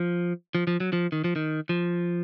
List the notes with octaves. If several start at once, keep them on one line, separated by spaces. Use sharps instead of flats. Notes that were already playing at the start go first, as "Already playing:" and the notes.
Already playing: F3
F3
F3
F#3
F3
D#3
F3
D#3
F3